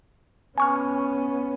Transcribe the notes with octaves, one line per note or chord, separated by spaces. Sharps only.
B3 C#4 G#5 C#6 F6